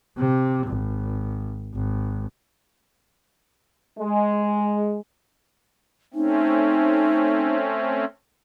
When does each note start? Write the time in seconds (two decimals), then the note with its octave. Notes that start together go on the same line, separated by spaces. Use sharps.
0.17 C3
0.67 G#1
1.74 G#1
3.99 G#3
6.14 A3 C4 C#4 D#4